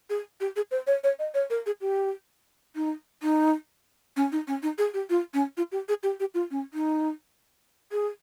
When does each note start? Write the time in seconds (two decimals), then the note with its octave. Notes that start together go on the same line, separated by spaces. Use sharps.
0.10 G#4
0.40 G4
0.56 G#4
0.71 C5
0.87 C#5
1.04 C#5
1.19 D#5
1.34 C#5
1.50 A#4
1.66 G#4
1.81 G4
2.75 D#4
3.23 D#4
4.17 C#4
4.32 D#4
4.47 C#4
4.63 D#4
4.78 G#4
4.94 G4
5.10 F4
5.34 C#4
5.57 F4
5.72 G4
5.89 G#4
6.03 G4
6.20 G4
6.34 F4
6.51 C#4
6.74 D#4
7.92 G#4